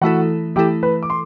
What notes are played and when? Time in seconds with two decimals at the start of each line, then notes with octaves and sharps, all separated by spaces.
0.02 E3 A3 E4 F#4 A4 F#5
0.56 E3 A3 E4 G4 A4 G5
0.83 B4 B5
1.03 D6
1.10 C6